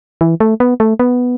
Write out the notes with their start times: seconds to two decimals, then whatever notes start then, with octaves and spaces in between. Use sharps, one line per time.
0.21 E3
0.40 A3
0.60 B3
0.80 A3
0.99 B3